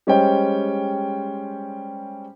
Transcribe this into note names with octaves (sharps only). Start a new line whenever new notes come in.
G3 G#3 C#4 C5 D#5 G5